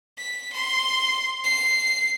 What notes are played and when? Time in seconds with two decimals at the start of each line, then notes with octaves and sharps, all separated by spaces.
0.18 B6
0.53 C6
1.44 C7